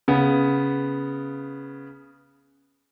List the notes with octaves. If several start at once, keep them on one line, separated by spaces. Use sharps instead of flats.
C#3 B3